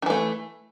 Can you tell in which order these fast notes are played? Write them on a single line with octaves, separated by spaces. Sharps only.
D#3 E3 A3